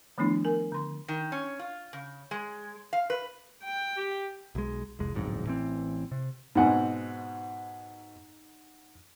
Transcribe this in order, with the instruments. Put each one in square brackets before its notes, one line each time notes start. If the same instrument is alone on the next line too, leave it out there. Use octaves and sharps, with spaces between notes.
[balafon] D#3 F3 A3 B3 D4 E4
A#4 G#5
D3 C6
[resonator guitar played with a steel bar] D#3
C#4
F4
C#3
G#3
F5
B4
[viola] G5
[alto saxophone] G4
[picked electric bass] B1 G#3
F1 C2 G#3
D1 B1 F2 G#2
A1 E3 C4
C3
[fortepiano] G#2 B2 C4 [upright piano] D#4 F#5 G#5